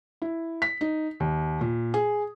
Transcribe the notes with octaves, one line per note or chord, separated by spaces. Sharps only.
E4
B6
D#4
D#2
A#2
G#4